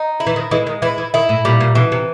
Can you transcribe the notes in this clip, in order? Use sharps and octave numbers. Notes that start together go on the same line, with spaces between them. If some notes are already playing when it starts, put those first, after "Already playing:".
Already playing: D#4
E4
E3
D#3
E3 G#3
D#3
E3 E4
E3
D#3 E4
A2
A#2 G3
A#2
B2 E3
C3